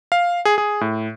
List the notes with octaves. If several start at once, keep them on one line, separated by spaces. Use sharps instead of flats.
F5
G#4
G#4
A2